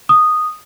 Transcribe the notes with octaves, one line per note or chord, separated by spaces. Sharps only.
D#6